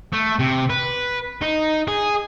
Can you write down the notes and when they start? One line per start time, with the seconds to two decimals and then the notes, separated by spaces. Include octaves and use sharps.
0.13 A3
0.39 C3
0.70 B4
1.42 D#4
1.88 G#4